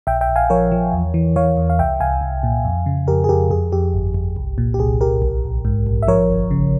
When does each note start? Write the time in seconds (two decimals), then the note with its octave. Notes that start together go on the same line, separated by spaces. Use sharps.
0.07 A#1 E5 G5
0.21 E5 G5
0.29 A#1
0.36 F5 G#5
0.50 F3 A#4 C#5
0.72 F3
0.93 E2
1.14 E3
1.36 E3 C#5 F5
1.57 E2
1.70 F5
1.79 C2 E5 G5
2.00 C2 F5 G#5
2.21 C2
2.43 A#2
2.65 F2
2.86 C#3
3.08 F2 G4 A#4
3.24 G#4
3.29 F2 G4 A#4
3.50 F2 G#4
3.72 F2 G4
3.94 G1
4.14 G1
4.36 C2
4.58 A#2
4.74 G4
4.79 C2 G#4
5.01 C2 G4 A#4
5.22 A#1
5.44 A#1
5.65 G#2
5.87 A#1
6.03 E5
6.08 F3 A#4 C#5
6.30 G1
6.51 C#3